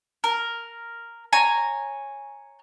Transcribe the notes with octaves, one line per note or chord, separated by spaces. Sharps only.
A#4
C#5 G#5 A#5